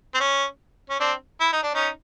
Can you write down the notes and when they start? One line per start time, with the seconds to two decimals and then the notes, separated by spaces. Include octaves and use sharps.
0.15 C4
0.20 C#4
0.90 C#4
1.00 C4 D4
1.41 E4
1.52 D#4
1.63 D4
1.74 C#4 D#4